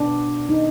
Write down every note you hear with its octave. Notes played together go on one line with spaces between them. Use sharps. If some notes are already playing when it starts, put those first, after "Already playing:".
Already playing: B2 B3 D4
D#4